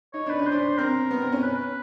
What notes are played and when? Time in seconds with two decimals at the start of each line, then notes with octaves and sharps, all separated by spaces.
0.14 D#4 C#5
0.26 D4 B4
0.39 C#4
0.46 C5
0.52 D4
0.78 C4 A#4
1.11 B3
1.22 C4
1.32 C#4
1.43 B4